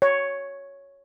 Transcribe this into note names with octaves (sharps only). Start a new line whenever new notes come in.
C#5